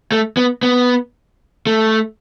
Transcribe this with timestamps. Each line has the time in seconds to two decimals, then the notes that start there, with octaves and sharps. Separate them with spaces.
0.12 A3
0.37 B3
0.63 B3
1.67 A3